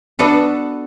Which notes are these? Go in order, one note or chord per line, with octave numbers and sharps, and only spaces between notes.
B3 D4 F#4 A4 B4